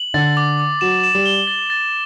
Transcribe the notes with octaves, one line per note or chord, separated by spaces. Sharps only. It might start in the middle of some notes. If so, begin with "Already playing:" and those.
Already playing: F#7
D3 A6
D6
D6
F#3 E7
E7
G3
G7
A6
A6